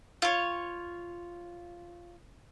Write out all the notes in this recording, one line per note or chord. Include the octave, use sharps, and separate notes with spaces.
F4 C#5